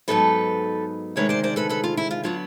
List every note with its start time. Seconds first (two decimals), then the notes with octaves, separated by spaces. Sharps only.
0.08 G#2 D#3 F#3 B3 D#4 A4 B4
1.16 D2 C3 D#3 G#3 B4 C#5
1.29 C5 D5
1.43 C5 D5
1.56 A4 B4
1.69 A4 B4
1.84 F4
1.97 E4
2.11 F4
2.23 D3 F#3 B3 F4